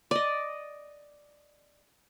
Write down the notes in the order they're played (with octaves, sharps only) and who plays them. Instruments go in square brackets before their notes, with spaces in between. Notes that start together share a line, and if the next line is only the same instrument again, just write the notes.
[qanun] D5 D#5